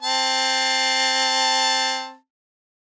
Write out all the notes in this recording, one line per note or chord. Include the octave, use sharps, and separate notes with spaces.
C4 A5